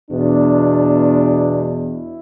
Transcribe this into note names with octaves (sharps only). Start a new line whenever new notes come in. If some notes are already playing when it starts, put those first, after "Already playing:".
E2 B2 D4
E4